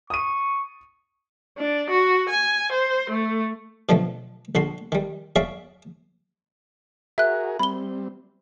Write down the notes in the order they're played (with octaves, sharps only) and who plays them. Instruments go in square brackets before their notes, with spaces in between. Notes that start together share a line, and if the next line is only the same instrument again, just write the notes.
[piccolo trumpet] C#6 [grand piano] D#6 D#7
[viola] D4
F#4
G#5
C5
A3
[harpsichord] B2 D3 F3 F#3 A3
A#1 D3 F#4 C6
D#3 G3
F#4 G#4 C#5 D5 E5 F5
[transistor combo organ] F#4 G#4 A#4 [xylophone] E5 F#6
[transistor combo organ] G3 C4 [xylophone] B5 G7